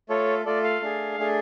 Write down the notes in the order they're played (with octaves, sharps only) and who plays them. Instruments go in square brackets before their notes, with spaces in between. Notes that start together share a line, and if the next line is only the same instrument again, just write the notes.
[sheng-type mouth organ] A3 F4 A4 C#5
A3 F4 A4 D5
F5
A3 D4 G#4
A3 D4 G#4